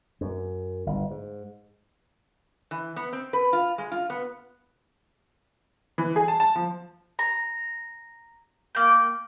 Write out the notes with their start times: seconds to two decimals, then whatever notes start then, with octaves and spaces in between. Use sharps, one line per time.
0.21 F#2
0.86 G1
1.11 G#2
2.71 E3
2.96 B3
3.13 C4
3.33 B4
3.53 F4
3.78 G#3
3.92 F4
4.10 B3
5.98 E3
6.16 G#4
6.28 A5
6.40 A5
6.56 F3
7.19 A#5
8.75 A#3 G5